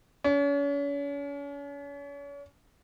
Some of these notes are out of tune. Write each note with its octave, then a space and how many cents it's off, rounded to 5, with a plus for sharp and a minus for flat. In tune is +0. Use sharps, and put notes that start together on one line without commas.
C#4 +40